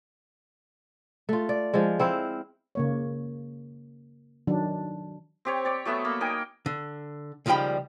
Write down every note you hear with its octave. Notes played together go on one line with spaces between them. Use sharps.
A3 F4
D5
F3 G#3
C4 E4 C5 F5
C#3 A#3 C#5
D#3 F#3 D4
C4 G4 C#5
C#5 D5
F#3 A3 B3 E5
A#3 B5 E6
D#4 A#4 G5 G#5
D3
C#2 D#3 F3 G3 G5 B5